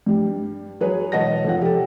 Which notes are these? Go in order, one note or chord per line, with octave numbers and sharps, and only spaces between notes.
G2 G3
F#3 G#4 B4 C#5
E1 C#5 D#5 F#5 A5 A#6
F1 F3 F#5
G4 A4